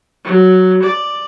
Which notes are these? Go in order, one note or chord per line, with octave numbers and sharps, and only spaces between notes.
F#3
D5